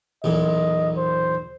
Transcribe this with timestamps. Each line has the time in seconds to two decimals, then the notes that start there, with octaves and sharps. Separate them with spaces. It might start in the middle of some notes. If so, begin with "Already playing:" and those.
0.24 B1 E2 A#2 D#5
0.97 C5